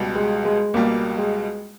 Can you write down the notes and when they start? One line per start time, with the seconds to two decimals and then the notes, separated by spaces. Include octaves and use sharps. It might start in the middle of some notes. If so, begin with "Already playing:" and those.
Already playing: C#2 B2 G3
0.15 G#3
0.45 G#3
0.74 C#2 B2 G3 A#3
1.18 G#3